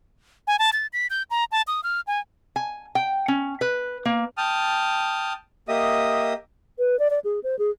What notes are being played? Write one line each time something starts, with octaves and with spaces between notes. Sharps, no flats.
G#5
A5
A6
B6
G6
A#5
A5
D#6
F6
G#5
G#5
G5
C#4
B4
A#3
G5 A5 D#6 F6
A#3 G4 D#5 E5 D#6
B4
D5
D5
G#4
C5
G#4